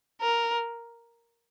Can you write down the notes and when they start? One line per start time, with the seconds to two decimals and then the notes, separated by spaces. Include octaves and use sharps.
0.21 A#4